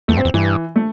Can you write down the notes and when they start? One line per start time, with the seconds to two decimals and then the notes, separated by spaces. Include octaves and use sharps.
0.08 E2 A3
0.17 G2 C4
0.25 E2
0.34 G2 E3
0.76 A3